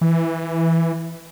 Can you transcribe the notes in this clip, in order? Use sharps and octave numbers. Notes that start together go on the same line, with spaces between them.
E3